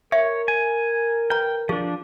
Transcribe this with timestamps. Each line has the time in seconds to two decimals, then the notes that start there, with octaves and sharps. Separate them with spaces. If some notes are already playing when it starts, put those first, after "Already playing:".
0.12 A#4 C#5 E5
0.48 G#5
1.30 B4 G5 A#5
1.69 F3 D4 G#4